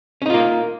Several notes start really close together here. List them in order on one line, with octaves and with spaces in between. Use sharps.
C#4 D#4 F4 A#3